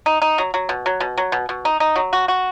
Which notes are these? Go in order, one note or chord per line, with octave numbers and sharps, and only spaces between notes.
D#4
D#4
F#3
F#3
B2
F#3
B2
F#3
B2
B2
D#4
D#4
F#3
F#4
F#4